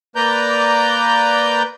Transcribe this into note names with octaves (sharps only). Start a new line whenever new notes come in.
A#3 B4 D5 A#5 G6